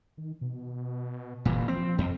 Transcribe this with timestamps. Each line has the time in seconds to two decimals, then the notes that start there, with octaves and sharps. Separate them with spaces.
0.17 D#3
0.41 B2
1.45 F#1 A#2 E3
1.68 F3 C4
1.98 F2